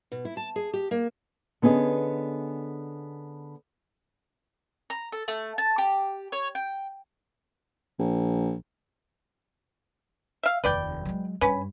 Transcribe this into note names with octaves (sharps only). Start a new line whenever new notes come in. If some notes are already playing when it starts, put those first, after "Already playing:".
B2
E4
A5
G#4
G4
A#3
D3 B3 C#4 G#4 D#5
A#5
A4
A3
A5
G4
C#5
G5
A#1
E5 F5
F1 D#2 B4 D5 G5
F#3 G#3
G2 C#4 B4